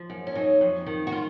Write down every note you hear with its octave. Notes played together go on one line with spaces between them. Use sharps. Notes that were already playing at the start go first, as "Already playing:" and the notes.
Already playing: F3
F#2
C#4
F#3 D#4
F2
D#3
F#4
F4